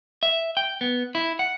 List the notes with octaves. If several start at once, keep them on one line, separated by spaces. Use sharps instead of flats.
E5
G5
B3
E4
F#5